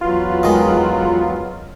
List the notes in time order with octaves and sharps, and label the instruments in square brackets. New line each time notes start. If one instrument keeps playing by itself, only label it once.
[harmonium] E2 F#4 B4 [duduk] F#3 [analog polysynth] F4
[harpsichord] D#3 G#3